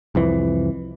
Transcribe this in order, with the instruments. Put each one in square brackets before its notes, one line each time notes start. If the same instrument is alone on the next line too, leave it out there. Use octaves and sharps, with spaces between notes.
[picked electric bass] C2 F2 E3